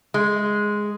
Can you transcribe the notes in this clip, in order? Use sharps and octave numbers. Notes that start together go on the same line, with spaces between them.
G#3